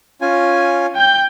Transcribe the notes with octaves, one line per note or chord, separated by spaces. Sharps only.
C#4 F4 G#5
G5 G6